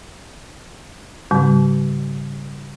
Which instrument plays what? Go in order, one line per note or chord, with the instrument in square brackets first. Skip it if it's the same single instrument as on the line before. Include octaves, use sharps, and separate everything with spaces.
[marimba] G#2 C#3 G3 C4